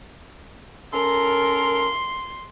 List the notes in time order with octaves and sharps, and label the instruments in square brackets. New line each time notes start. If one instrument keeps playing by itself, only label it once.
[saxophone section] C#4 A4 A#4 [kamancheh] C6